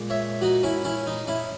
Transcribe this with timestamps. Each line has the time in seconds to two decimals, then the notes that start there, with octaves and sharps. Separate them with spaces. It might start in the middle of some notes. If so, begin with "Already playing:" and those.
Already playing: A#2 G#3
0.10 C#5 E5
0.41 D#4 F#4
0.63 C#4 E4
0.84 C#4 E4
1.07 D#4
1.27 C#4 E4